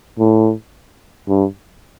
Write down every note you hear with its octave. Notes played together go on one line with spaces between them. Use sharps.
A2
G2